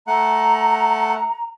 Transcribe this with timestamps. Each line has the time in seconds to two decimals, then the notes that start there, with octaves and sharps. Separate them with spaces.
0.07 A3 F#5 A#5